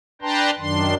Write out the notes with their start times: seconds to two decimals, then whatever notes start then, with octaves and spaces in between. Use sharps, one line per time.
0.22 D4 B4 G5 A5 A#5 C6
0.59 F#2 D#3 D4 C6